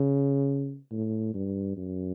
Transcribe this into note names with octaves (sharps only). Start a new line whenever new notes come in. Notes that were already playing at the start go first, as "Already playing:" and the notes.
Already playing: C#3
A2
G2
F#2